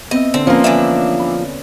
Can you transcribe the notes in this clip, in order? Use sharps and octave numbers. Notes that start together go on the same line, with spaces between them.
B3 C4 D#5 E5
D3 C4
F3 A#3 C#4 B4 E5
D3 E3 C#4 D4 E5
B5